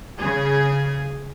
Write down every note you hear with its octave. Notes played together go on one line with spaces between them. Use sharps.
C#3 G#4